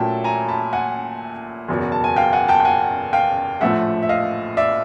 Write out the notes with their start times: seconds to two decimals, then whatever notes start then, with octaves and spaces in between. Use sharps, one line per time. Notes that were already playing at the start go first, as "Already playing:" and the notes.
Already playing: A#2 F#3 A3 C#4 E4 G5 A5
0.24 G#5 A#5
0.48 A5 B5
0.73 F#5 G#5
1.68 F#1 E2 B2 F#3
1.92 A5
2.04 G#5
2.16 F5 G5
2.33 F#5 G#5
2.48 G5 A5
2.60 G5
2.65 F#5 G#5
3.13 F5 G5
3.61 A#1 A2 F3 A3 E5 F#5
4.03 E5
4.09 D#5 F5
4.57 D5 E5